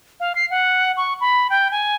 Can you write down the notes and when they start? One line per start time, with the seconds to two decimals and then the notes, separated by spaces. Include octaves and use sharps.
0.20 F5
0.35 C7
0.50 F#5
0.97 C#6
1.21 B5
1.50 G5
1.71 G#5